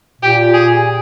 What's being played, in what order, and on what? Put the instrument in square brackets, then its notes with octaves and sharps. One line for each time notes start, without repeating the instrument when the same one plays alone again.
[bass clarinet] A#2 [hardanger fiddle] G4
[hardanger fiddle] G#4